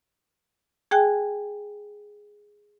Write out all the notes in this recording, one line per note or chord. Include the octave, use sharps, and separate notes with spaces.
G#4 G5 G#5 F#6